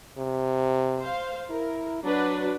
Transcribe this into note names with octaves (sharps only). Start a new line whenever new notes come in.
C3
C5 F5
E4 A#4
F#3 D4 F#4 B4